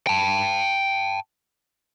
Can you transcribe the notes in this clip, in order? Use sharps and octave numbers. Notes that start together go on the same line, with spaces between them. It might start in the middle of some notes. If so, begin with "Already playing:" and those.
G5 A5